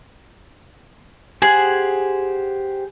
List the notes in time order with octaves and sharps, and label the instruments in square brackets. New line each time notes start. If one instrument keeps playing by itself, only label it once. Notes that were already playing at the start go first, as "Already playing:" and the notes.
[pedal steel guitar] G4 C5 F#5 [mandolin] G#4